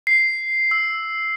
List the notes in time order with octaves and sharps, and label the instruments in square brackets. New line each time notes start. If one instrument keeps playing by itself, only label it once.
[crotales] C7
E6